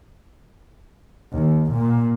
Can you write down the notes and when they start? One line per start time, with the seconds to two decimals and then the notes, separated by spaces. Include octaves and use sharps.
1.33 D#2
1.71 A#2